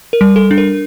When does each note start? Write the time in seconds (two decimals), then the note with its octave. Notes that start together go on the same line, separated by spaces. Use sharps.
0.13 A#4
0.21 G3
0.36 A4
0.51 D4
0.58 A#4